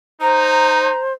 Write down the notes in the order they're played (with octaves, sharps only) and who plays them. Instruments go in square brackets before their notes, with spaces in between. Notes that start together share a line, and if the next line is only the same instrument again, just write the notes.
[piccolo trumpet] D#4 [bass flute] C5 [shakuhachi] A#5